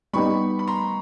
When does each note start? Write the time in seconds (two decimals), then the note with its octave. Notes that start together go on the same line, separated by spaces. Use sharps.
0.13 G3 B3 D#4 G4 B5 C#6
0.59 B5
0.68 A#5 C6